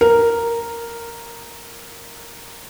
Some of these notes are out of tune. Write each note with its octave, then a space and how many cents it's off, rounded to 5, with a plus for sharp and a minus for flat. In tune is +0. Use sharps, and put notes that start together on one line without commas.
A#4 -5